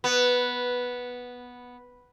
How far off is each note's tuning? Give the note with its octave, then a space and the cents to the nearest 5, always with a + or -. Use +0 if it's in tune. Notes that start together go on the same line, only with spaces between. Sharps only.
B3 -5